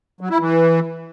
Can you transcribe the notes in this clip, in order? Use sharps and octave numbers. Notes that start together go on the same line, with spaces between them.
F#3
E4
E3